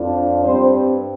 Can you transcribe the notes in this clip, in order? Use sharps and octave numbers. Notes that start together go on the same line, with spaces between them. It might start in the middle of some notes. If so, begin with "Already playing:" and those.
Already playing: F2 F3 D4
G2 G3 C4 C5